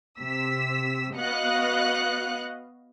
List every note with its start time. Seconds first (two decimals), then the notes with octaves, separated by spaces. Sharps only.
0.20 C3 E6 B6
1.14 B3 F#4 D#5 F5 F#6 C#7